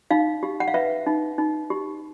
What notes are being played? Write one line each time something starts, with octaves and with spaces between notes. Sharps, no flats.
D#4 F5
G4
F#5
F5
B4 E5
D#4
D#4
G4